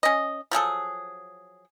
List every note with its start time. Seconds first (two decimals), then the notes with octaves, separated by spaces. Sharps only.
0.03 C#4 D#5
0.51 F3 F#3 G#4 A4